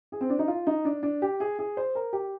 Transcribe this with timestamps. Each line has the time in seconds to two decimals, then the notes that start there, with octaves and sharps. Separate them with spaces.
0.12 G#4
0.21 C4
0.30 D4
0.39 D#4
0.48 F4
0.67 D#4
0.85 D4
1.03 D4
1.22 G4
1.40 G#4
1.59 G#4
1.77 C5
1.95 A#4
2.13 G4